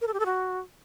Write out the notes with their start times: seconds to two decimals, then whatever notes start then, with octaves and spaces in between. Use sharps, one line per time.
0.01 A#4
0.07 A4
0.14 G4
0.20 A4
0.26 F#4